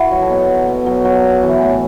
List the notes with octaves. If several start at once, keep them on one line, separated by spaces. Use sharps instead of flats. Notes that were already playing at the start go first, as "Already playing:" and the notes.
Already playing: E4 F#4 B4
F#3
A4
B2 B4
F#3
B2
F#3
F#3 F#4
B2
E3
A2